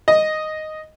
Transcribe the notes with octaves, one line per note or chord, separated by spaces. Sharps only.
D#5